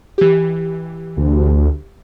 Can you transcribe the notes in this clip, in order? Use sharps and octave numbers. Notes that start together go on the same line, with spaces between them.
E3 G4
D2